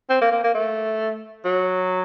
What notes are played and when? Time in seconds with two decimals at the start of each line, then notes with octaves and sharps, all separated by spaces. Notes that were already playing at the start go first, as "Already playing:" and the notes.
0.10 C4
0.22 A#3
0.32 A#3
0.44 A#3
0.55 A3
1.45 F#3